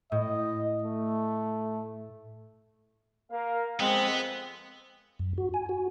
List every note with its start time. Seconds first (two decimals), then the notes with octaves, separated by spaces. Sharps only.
0.12 A2 D#5
0.84 A3
3.31 A#3 A#4 F5
3.80 F2 G#3 B3 C4
5.19 F#2
5.38 F#4
5.54 G#5
5.69 F#4